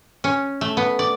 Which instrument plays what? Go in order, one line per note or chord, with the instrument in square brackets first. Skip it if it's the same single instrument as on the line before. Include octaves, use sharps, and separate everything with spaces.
[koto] C#4
A3
B3
D5